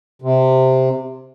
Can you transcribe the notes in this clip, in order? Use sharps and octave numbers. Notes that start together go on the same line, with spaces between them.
C3